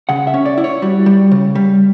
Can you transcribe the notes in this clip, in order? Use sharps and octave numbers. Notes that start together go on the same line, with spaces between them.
C#3 F#5
E5
C#4
D5
E4
C#5
G3 F#4
G3
C#3
G3